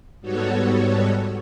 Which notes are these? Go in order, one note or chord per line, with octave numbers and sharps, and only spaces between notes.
G#2 G3 B3 F#4 A4 C#5